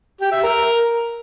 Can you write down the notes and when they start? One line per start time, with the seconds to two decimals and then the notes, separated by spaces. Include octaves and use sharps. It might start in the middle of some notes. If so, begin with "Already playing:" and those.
0.21 G4
0.32 E5
0.43 A#4